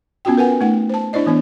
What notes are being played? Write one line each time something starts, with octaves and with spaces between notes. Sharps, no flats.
B3 C#4 F4 F#4 G5
A#4 B4 F#5 G#5
A3 D#4 F#5
C5 A5
D4 E4 C5 D5 D#5
E3 B3 D4